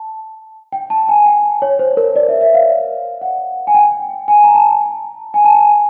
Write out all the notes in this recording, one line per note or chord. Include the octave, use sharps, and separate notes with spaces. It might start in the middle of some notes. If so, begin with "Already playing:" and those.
Already playing: A5
G5
A5
G#5
G5
C#5
C5
A#4
D5
E5
E5
F5
F#5
G#5
G5
G#5
A#5
A5
G#5
A5
G#5